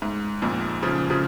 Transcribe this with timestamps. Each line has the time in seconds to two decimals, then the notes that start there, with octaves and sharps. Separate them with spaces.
0.02 G#2
0.42 F2 A#2
0.83 C#3 F3
1.10 C#3 F3